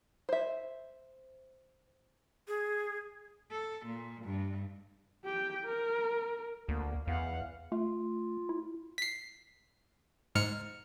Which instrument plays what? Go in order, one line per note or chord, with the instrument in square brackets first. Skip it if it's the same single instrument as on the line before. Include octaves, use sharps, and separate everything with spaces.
[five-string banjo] C5 E5
[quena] G#4
[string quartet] A4
A#2
G2
[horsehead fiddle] G4 G5
A#4
[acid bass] D2 [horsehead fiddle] A#3
[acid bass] E2 [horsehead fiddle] F5 F#5
[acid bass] A3 [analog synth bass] F4
[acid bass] E4
[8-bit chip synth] B6 C7
G#2 F6 C#7